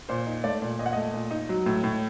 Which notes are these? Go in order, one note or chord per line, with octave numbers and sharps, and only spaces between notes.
A#2 C5
D#4
A3 D5
A#2
A#2 D#5
F#5
A3 D#5
A#2
D#4
F#3
A2
A2